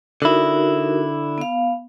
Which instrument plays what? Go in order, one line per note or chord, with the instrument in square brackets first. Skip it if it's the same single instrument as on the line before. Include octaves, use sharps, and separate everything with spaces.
[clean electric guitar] D3 E4 [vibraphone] D#4 F#4 A#4
[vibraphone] B3 F5